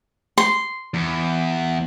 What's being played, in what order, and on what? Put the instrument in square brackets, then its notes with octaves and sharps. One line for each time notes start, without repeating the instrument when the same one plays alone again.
[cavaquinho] C6
[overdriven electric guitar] E2